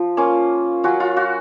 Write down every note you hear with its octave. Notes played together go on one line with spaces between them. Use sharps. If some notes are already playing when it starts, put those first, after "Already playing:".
Already playing: F3
A#3 C#4 F4
F#3 C#4 F4 F#4
F4
F#4